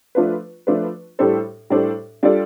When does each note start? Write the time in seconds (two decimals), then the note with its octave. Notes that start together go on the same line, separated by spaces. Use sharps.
0.15 F3 A3 D4 F4 B4
0.67 F3 A3 D4 F4 B4
1.19 A2 G3 D4 A4 C5
1.70 A2 G3 D4 A4 C5
2.23 G3 D4 F4 A4 D5